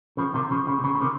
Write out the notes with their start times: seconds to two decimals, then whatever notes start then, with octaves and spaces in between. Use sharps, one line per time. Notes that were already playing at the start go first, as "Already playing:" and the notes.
0.17 C#3 F3
0.34 C3 D#3
0.51 C#3 F3
0.67 C#3
0.79 C3
0.84 C#3
0.95 C#3
1.01 C3 D#3